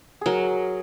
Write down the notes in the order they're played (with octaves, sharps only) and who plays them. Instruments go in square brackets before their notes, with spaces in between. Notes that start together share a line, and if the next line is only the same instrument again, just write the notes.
[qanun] F#3 [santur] G#4 A#4